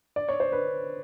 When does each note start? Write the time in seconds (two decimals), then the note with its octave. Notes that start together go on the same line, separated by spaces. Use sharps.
0.16 D5
0.29 C#5
0.40 C5
0.52 B4